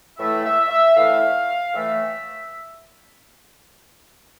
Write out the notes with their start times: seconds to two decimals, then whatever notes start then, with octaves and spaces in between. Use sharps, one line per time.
0.17 A2 E3 A3 E5
0.44 E5
0.69 E5
0.96 A2 E3 A3 F5
1.73 A2 E3 A3 E5